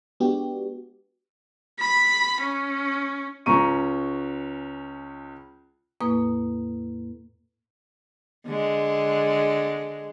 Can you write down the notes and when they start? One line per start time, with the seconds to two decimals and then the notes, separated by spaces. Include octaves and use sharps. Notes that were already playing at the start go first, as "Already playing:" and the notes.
0.20 G#3 B3 D4 F#4 G4
1.80 B5
2.41 C#4
3.46 C#2 C#4 A#5 C#6 D#7
6.01 E2 A2 A#3 B4 D#6
8.46 D3 G#3